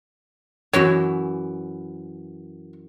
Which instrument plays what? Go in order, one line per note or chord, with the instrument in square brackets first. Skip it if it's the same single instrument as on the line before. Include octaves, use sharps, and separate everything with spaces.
[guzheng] F#2 E3 E4 [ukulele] F#4 C#5